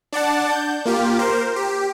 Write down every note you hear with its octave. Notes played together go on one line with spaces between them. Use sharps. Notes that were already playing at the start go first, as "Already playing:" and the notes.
D4 D5 F#5 A5
G6
A#3 F4 G4
A#4 C5
G4